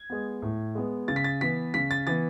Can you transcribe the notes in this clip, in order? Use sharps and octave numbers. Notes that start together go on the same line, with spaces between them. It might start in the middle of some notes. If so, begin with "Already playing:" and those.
Already playing: G#6
G#3 B3
A2
G#3 B3
C#3 A6
B6
A6
E3 B3 B6
C#3 B6
A6
E3 B3 A6